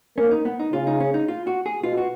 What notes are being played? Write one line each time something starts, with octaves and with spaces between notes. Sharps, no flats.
A#3 C#4
D#4
B3
D#4
C#3 F4
D#4
C#4
D#4
F4
F#4
G#4
B2 F4
F#4